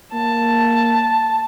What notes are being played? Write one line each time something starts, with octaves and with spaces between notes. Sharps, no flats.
A#3 A5